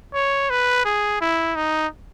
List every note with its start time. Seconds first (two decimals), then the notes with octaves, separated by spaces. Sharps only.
0.14 C#5
0.50 B4
0.85 G#4
1.21 E4
1.56 D#4